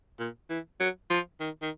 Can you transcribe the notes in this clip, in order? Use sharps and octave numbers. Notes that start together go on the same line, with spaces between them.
A#2
E3
F#3
F3
D#3
D#3